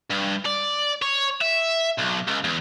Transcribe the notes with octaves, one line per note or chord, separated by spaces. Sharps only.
G2
D5
C#5
E5
B1
C#2
E2